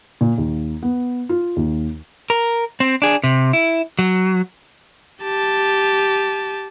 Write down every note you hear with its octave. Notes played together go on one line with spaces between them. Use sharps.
A#2
D#2
B3
F4
D#2
A#4
C4
D4 G#4
C3
E4
F#3
G4 A5